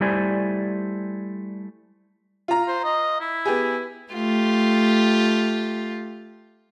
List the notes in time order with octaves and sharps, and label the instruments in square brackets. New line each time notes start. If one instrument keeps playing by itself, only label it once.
[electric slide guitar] G3 A3 E4 C5 D5 G#5
[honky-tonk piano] F4 A#5
[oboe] C5
D#5
E4
[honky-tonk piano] B3 G4 G#4
[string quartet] A3 F4 G4